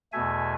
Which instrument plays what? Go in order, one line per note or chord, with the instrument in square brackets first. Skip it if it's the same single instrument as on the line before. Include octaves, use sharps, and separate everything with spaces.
[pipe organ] E2 B2 A3 E5 G#5